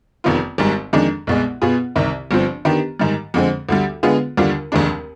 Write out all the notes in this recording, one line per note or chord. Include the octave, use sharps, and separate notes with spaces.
F1 F2 D#3 B3 F4
G#1 G#2 G3
F2 D#3 G#3 D4
C2 B2 G#3
B2 B3 F4 G#4
C2 C3 D#3
G1 G2 F3 C4
D#3 B3 D4 G4
G#2 D#3 G3
F2 D3 G#3 C4
D2 D3 G3
D3 G#3 B3 F4 G#4
D#2 D3 G3 D4 F4
F1 D#2 D#3 G#3 D4